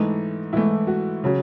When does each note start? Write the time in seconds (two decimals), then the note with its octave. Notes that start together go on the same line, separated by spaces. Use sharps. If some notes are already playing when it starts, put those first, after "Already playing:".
Already playing: G#2 E3 A3 D#4
0.53 G#2 E3 A3 E4
0.87 F#4
1.24 C#3 F#3